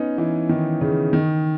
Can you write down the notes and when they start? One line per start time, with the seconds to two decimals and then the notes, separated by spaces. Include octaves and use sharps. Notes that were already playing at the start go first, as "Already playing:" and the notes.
Already playing: B3 C#4 D#4
0.18 E3
0.49 D#3
0.81 C#3
1.13 D#3